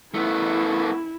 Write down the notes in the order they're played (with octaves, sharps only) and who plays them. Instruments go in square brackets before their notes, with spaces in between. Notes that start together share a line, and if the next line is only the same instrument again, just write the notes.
[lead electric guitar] A3 B3 [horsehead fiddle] E4